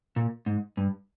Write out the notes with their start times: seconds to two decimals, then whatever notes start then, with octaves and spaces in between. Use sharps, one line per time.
0.16 A#2
0.46 G#2
0.77 G2